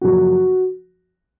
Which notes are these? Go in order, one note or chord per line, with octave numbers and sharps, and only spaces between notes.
F#2 C#3 F3 A#3 F#4